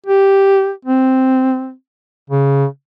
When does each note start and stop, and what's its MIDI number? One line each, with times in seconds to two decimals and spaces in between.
0.06 0.70 67
0.85 1.73 60
2.30 2.65 49